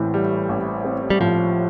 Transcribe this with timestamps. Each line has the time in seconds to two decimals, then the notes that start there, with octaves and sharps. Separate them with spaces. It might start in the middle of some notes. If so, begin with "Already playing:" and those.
Already playing: A1 A2 E3 C4
0.14 G3
0.49 A1
0.85 C4
1.10 G3
1.21 A2 F3